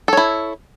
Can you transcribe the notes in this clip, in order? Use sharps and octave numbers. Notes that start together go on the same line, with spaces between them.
E4 A4 C#5